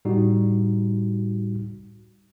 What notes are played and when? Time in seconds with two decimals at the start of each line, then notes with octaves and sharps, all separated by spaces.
0.05 A2 G3 D#4 F#4